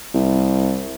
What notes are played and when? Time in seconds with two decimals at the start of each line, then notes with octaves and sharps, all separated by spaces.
0.14 C2